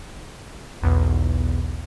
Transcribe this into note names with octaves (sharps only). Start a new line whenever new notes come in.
B1 E2 B2